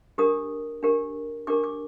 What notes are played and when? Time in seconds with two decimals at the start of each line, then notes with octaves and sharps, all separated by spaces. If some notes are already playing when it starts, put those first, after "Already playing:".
0.18 D4 G4 A#4 D#6
0.83 D4 G4 A#4
1.47 D4 G4 A#4 D6
1.64 D6